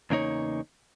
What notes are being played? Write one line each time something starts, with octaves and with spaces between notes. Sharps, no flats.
E2 C#3 A#3 D#4 C#5